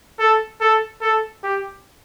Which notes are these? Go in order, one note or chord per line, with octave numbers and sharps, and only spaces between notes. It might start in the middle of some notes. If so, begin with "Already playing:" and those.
A4
A4
A4
G4